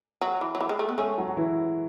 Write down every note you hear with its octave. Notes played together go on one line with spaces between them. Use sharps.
F#3
E3
F#3
E3
G#3
A3
B3
G#3 A3 C#4 G#4
F#3 F#4
F#4
E3 E4